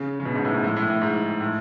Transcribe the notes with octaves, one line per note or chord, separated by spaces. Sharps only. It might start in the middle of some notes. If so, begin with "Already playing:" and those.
Already playing: C#3
C#3
B2
G#2
A2
G#2
A2
A2
A2
G#2
A2